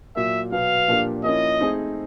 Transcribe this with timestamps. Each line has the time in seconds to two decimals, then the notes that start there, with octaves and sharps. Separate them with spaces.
0.16 A#2 F#3 A#3 E5
0.52 B2 F#3 B3 F5
0.88 A#2 F3 A#3 D4 G4
1.24 F3 A#3 C#4 E4 D#5
1.60 A3 C4 D#4 G#4 C5